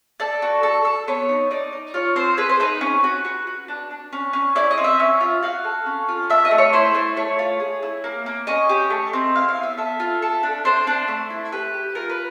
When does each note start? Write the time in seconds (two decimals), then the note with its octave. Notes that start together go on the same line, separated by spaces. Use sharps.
0.20 A4 D5
0.42 F#4
0.63 A4
0.85 A4
1.08 B3 C#5
1.29 D#4
1.51 D#4 D5
1.72 D#4
1.94 F4 C#5
2.16 C4 C5
2.37 G#4 B4
2.49 C5
2.60 D#4 B4
2.81 C#4
3.04 F#4
3.25 F#4
3.47 F#4
3.68 D4
3.91 D4
4.13 C#4
4.33 C#4
4.55 E4 D5
4.71 D#5
4.78 C4
4.84 E5
5.00 C#4
5.21 F4
5.43 F#4 F5
5.64 A4
5.86 C#4
6.09 F4
6.30 A3 E5
6.45 D#5
6.51 A3
6.58 C#5
6.73 E4 C5
6.94 A3
7.17 A3 C#5
7.39 F4
7.60 G#4
7.82 E4
8.04 A#3
8.26 A#3
8.47 C#4 D#5
8.69 G4
8.90 A3
9.13 C4
9.35 E4 F5
9.49 F5
9.56 B3
9.63 E5
9.78 A4 E5
10.00 F4
10.22 A4
10.43 D4
10.65 D4 C5
10.87 D4
11.08 A3
11.30 E4
11.52 G4 B4
11.74 G4
11.95 F4 A#4
12.10 B4